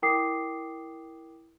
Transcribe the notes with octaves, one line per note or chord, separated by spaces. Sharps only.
E4 A#4 G5 D6 D#6 C7